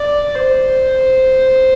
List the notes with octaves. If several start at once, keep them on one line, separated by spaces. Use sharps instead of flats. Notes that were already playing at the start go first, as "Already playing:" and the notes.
Already playing: D5
C5